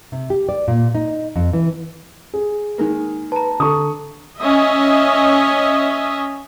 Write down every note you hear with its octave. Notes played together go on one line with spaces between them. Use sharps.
C3
G4
D5
A#2
D#4
F2
E3
G#4
D#3 G#3 A#3
B4 A5 A#5
D3 A4 C#6 D#6
C#4 D#5 E5